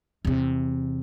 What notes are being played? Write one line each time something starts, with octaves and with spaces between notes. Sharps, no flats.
E2 C3